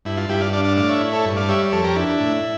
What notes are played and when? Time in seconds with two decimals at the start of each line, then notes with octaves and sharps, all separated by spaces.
0.05 G2 E4
0.17 F4
0.29 G2 E4 G4
0.41 D5 F5
0.53 D4 D5 F5
0.65 D5 F5
0.77 A2 D5 F5
0.89 C#5 E5
1.01 E4
1.13 A4 C#5
1.25 G2
1.37 D5 F5
1.49 G3 C#5 E5
1.72 F2 A4 C#5
1.84 G4 A#4
1.96 D4 E4
2.20 A2